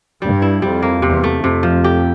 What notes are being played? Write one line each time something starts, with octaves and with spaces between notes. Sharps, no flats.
G2 G3
E4
F2 G3
A#3
E2 C3
A3
F2 C3
F3
G4